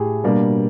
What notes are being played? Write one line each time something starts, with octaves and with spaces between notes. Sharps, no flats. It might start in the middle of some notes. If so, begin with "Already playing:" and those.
Already playing: A2 G4 G#4
B2 G3 A#3 D4